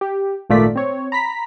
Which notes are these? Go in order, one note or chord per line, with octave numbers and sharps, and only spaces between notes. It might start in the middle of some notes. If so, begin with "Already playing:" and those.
G4
G#1 A#2 A3 F4 D5 B6
C4 C#5
A#5 B5 B6